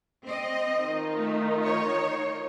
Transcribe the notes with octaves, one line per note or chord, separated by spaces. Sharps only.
C4 D#5
D#3 D#4 F4
A3
C#5